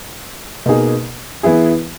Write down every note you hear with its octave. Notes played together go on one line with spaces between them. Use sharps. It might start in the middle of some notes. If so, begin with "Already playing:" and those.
B2 A#3 D#4 G#4
E3 B3 E4 G#4